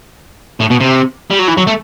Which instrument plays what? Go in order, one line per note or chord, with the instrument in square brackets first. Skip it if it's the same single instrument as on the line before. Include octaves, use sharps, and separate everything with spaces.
[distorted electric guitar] A2
B2
C3
G3
F#3
E3
F#3
A3